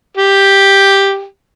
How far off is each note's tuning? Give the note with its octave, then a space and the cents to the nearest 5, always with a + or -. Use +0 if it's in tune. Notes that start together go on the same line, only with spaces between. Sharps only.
G4 +5